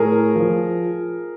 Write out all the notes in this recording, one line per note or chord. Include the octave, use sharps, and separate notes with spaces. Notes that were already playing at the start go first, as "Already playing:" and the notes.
Already playing: A2 G#4 A#4
F3